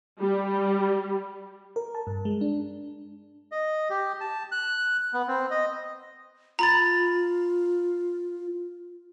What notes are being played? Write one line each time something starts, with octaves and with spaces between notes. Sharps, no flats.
G3
A#4
A5
G2
G#3
D4
D#5
G4
A5
F#6
B3
C4
D#5
F4 A#5 B5 A6